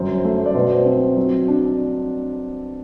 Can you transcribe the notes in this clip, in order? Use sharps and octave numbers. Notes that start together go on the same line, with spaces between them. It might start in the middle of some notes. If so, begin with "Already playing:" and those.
Already playing: G1 F#2 C5
A3
D5
B2 C5
C4
F#3
D4